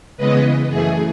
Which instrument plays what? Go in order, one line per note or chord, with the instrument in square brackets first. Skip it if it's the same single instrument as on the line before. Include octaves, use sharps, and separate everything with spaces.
[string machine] C#3 E3 G#3 B3 B4 D#5
F#2 E3 A3 G#4